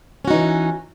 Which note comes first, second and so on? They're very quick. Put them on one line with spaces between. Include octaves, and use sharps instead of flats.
C#4 F#4 D#4 E3